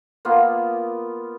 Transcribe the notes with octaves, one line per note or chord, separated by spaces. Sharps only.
A#3 B3 F4